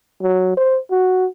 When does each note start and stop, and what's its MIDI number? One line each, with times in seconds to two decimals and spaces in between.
0.22 0.54 54
0.57 0.78 72
0.91 1.26 66